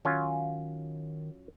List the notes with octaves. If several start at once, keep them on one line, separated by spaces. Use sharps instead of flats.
D#3 F#3 C#4 F4